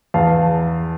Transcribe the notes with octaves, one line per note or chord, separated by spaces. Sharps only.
E2 F5 A5